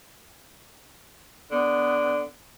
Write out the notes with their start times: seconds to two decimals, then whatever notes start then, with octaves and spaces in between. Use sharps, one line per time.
1.51 D3 B3